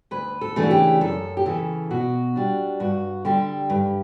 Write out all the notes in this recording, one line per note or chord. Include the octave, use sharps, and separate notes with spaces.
D2 B4
A4
C#3 E3 A3 D4
F#4
G4
F#2 A4
G4
C#3 E3 A4
B2 F#4
G3 D4
G2 F#4
D3 G3 G4
G2